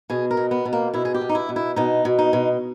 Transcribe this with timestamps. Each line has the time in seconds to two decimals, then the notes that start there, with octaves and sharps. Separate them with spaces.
0.10 B2 G#4
0.31 A#4
0.37 B2
0.51 B3
0.65 B2
0.73 A#3
0.94 B2 E4
1.05 G#4
1.14 G4
1.21 B2
1.29 D#4
1.35 E4
1.49 B2
1.56 E4
1.76 B2 D#4
2.05 B2
2.19 D#4
2.33 B2